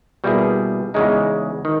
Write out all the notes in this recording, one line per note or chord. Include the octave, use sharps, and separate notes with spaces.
B2 G3 A#3 E4 G#4
E2 C#3 G#3 D#4
D#3